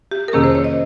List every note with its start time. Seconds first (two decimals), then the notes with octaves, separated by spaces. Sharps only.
0.11 G4
0.28 A#4
0.33 F2 C3 D#3 A#3 C#4 G#4
0.44 C5
0.55 C#5
0.64 D#5